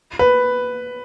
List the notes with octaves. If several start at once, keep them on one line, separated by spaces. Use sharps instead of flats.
B4